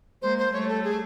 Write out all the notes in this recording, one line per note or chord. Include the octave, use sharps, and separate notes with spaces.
G#3 A#3 C5
C5
G3 A3 C#5
A4
G#4